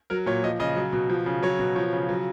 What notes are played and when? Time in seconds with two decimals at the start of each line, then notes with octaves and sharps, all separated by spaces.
0.10 F#3 A#4
0.26 A#2 C#5
0.43 F3 D#5
0.60 C#3 D#5
0.76 F#3
0.93 B2
1.10 F3
1.26 C#3
1.43 F#3 C#5
1.59 B2
1.75 F3 C#5
1.93 C#3
2.09 F#3